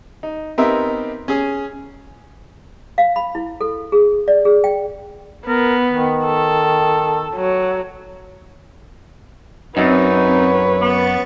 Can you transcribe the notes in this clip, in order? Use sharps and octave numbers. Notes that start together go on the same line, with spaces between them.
D#4
B3 C4 D#4 G4 A#4 E5
C#4 G#4
F5
B5
E4
A4
G#4
D5
G#4
G5
B3 A#4
D#3
A4
F#3
F#2 C4 D#4 B4 C#5
B3 C#6 D6 A6